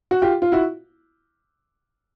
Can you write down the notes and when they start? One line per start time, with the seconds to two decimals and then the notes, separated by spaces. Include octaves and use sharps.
0.11 F#4
0.22 F4 G4
0.42 F4
0.52 E4 F#4